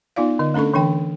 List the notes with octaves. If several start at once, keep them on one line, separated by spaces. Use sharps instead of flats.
B3 D#4 F4 D5 F5
D3 D#5
A3 C#4 D4 A4 C#6
D3 E3 D4 G5